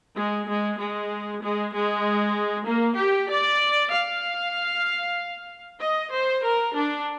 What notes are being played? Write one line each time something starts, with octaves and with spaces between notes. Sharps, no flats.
G#3
G#3
G#3
G#3
G#3
A#3
G4
D5
F5
D#5
C5
A#4
D4